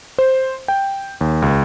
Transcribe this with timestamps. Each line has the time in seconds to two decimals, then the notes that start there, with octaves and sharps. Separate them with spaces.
0.18 C5
0.68 G5
1.21 D#2
1.42 C#2